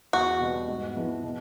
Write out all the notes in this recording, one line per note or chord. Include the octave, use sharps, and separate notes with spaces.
E2 F#4
B2 G3 B3
G#2
F3 G#3 B3 E4
B2